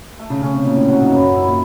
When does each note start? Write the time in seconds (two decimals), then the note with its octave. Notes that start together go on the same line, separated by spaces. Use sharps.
0.19 A3
0.30 C#3
0.41 C#3 C#4
0.54 C3
0.65 A#2 C#3
0.76 A2
0.88 F#3
1.00 G#2
1.11 F#2 B3
1.23 F#2
1.35 G#2 E4
1.46 A#2